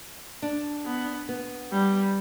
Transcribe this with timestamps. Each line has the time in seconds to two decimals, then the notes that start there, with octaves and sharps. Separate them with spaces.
0.42 D4
0.86 B3
1.29 B3
1.72 G3